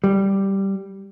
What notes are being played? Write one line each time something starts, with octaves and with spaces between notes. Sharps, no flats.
G3